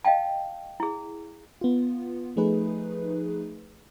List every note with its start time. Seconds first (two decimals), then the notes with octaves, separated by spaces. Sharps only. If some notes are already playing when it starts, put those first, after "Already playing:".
0.05 D#5 F5 G5 A5
0.80 E4 G#4
1.61 B3 F4
2.36 F3 A3 D#4 G#4 B4